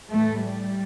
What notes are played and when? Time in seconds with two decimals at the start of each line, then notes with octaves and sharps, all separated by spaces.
0.11 A2 E3 A3
0.43 G3